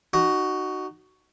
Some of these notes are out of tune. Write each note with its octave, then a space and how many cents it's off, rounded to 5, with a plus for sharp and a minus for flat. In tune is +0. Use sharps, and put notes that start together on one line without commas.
D#4 -25 F#4 +10